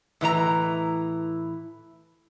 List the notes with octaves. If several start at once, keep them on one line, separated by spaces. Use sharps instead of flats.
A2 E3 E4 A#5